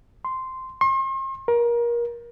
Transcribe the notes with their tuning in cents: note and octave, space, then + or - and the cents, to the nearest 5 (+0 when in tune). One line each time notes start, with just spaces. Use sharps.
C6 -5
C6 +45
A#4 +25